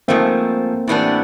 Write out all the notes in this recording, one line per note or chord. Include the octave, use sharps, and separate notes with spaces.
G#2 F3 A3 A#3 C4
A2 E3 G3 B3 D4